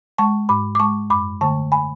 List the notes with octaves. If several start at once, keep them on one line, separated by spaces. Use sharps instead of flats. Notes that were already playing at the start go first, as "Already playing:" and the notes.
G#3 A5 C#6
G#2 B5 D6
D6
G#3 A5 C#6
F#2 B5 D6
D3 A3 A5 C#6
G#5 B5